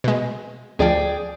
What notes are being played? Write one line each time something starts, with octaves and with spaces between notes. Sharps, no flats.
B2 G#3
D2 F3 G#4 D5 G5